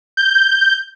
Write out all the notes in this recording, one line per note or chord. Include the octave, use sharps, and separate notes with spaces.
G6